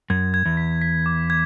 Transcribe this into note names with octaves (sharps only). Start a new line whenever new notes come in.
F#2 G#6
G#6
E2
B6
B6
D6
G#6